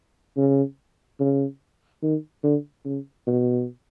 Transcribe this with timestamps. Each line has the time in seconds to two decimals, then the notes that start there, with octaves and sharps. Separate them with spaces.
0.37 C#3
1.20 C#3
2.02 D#3
2.43 D3
2.85 C#3
3.27 B2